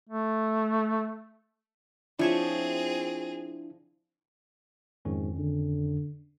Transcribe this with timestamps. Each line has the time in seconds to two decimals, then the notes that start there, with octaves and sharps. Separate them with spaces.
0.09 A3
2.19 F3 C4 D4 E4 G#4 C#5 E5
5.05 F2 G#2 D#3 C#4
5.38 D3